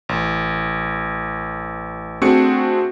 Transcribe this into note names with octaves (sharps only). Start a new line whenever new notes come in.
A1
A3 C4 D4 F#4 G#4 C#7